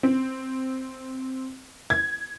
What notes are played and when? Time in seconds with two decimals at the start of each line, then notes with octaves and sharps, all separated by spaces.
0.03 C4
1.90 G#6